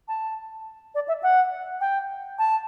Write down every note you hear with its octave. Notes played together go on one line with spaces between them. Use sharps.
A5
D5
E5
F#5
G5
A5